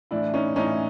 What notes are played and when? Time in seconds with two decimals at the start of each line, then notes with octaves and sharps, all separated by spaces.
0.11 A2 E3 D4 E4
0.34 C#4 D#4
0.56 A2 E3 C#4 D#4